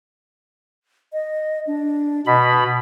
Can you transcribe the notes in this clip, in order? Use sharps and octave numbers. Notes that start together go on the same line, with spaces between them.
D#5
D4
B2 D#5 B5